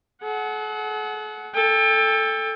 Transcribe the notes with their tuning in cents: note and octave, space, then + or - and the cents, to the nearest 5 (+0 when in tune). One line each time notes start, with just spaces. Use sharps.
A4 -45 F#5 +5
A4 +0 G5 +35